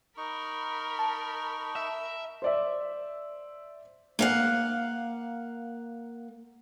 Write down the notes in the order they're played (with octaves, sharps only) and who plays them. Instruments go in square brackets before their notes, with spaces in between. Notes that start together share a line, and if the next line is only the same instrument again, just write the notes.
[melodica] D#4 C#6 [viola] A#4 B5
[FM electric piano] A5
[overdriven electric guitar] E5
[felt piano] C5 D5 E5
[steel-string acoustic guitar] A#3 F5 F#5